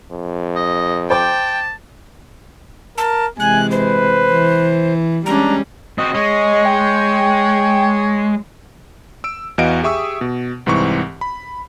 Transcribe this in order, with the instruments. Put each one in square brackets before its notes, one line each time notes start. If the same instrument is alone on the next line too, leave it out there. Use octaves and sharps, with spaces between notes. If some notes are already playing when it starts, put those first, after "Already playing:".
[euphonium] F2
[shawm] D#5
[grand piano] C5 D6 [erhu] G5 [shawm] A5
[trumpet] A#4 [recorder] A5
[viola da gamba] C3 E3 G#3 [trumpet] G#5 [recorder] F#6
[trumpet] B4 [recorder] C5
[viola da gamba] E3
[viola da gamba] G3 G#3 C#4 [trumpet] D4 [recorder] A#5
[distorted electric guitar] C4 F#4 [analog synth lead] D#5
[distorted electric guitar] G#3 [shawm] C#5 [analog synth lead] D#5
[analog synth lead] G5
[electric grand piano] E6 D7
E2 E3 F#4 D#5 F5 D7
G4 G#4 E5 C#6 D#6 E6
B2
C2 G#2 E3 C4 C#6
B5